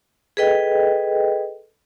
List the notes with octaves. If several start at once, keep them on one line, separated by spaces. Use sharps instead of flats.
G#4 A4 B4 D#5 G5